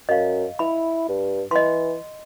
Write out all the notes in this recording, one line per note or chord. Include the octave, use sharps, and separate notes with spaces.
F#2 D#5 F5
E4 B5
G2
E3 D#5 C6